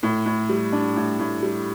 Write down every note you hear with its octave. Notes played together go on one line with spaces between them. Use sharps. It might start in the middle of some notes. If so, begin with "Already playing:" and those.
A2
A2
G3
D4
A2
A2
G3